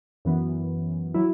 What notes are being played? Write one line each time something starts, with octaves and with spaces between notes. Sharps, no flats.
F#2 E3 B3
F#3 E4